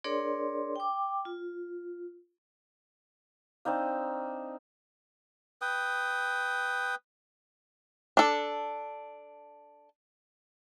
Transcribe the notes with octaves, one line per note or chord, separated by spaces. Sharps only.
D4 G#4 A#4 C#5 D5 C6
G5 D6
F4
C4 D4 D#4 F5
B4 G5 D#6
D4 A4